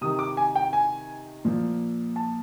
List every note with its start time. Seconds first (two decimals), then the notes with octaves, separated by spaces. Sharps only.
0.01 C3 D#3 D#6
0.19 D6
0.37 G#5
0.55 G5
0.73 G#5
1.45 A#2 F3
2.16 A5